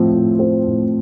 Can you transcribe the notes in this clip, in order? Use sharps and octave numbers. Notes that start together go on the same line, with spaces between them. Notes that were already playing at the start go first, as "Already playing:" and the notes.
Already playing: A2 F3 C4
A2
C4
A2